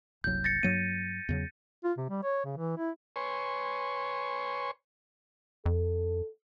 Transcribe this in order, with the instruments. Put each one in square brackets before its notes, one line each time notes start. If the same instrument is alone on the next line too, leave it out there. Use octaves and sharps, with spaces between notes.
[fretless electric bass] F#1 C2 F#3 [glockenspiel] G6
[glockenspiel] A6 A#6 C#7
[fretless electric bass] G2 F#3 A#3 [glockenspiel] D#7
[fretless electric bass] E2 C#3 F#3
[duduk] F4
C3
G3
C#5
C#3
E3
E4
[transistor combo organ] B4 C#5 G#5 C6 C#6
[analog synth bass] F2 [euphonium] A4